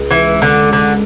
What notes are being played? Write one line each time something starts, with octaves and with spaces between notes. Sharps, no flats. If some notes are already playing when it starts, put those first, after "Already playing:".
Already playing: C#2
E3
D3
D3